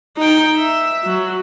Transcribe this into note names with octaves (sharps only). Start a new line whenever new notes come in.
D#4 G5
E5
F#3